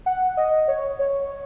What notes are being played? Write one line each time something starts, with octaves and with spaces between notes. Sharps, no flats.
F#5
D#5
C#5
C#5